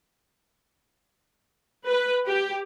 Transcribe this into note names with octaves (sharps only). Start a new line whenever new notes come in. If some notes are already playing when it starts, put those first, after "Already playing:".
B4
G4